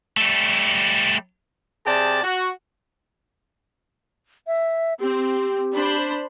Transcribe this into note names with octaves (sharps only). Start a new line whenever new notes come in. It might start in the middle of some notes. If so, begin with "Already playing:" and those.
G3 A3
C3 G#4 D5 G5 A5
F#4
E5
C4 G4
D4 C5 B5